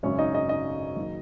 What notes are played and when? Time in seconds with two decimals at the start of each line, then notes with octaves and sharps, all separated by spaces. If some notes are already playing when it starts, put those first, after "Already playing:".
0.03 G#1 F#2 C#3 F#3 C#4 C#5
0.19 D#4 D#5
0.34 D#4 D#5
0.49 D#4 D#5
0.96 F#1 D#3 F#3